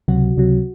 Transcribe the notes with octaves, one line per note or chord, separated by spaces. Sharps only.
C#2 C3 F#3 F#4
C#2 C3 F#3